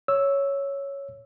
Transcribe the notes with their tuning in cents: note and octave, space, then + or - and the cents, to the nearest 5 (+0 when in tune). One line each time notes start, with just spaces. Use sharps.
C#5 +0 E6 +0